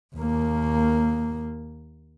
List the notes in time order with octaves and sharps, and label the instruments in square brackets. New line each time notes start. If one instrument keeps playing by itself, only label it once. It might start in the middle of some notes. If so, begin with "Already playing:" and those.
[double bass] D#2 A#3